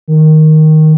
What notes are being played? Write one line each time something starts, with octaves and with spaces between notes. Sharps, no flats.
D#3